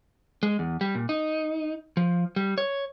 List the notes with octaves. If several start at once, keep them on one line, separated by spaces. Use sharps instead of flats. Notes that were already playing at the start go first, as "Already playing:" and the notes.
G#3
E2
G3
A#2
D#4
F3
G3
C#5